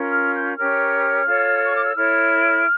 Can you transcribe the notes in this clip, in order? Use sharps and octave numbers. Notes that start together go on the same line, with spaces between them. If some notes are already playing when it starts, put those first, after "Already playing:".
Already playing: C#4 F4 A#4
F6
G6
C#4 G4 A#4 C#5 F6
F4 A4 C#5
C#6
D6
E6
E4 A4 C#5 F6